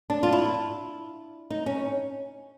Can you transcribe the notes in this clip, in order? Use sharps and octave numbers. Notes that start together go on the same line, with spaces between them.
D4
F4
E4
D#4
C#4